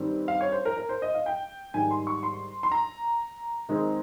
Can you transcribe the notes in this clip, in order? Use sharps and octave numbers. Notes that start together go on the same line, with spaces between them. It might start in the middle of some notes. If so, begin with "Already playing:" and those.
Already playing: G2 D#3 G3 C4 D#4
F5
C#5
C5
A#4
A#4
C5
D#5
F5
G5
G#2 D#3 G3 G#5
C6
C#6
C6
C6
A#5
D#3 G#3 C4